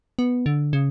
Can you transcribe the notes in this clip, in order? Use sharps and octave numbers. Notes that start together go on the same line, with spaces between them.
B3
D3
C#3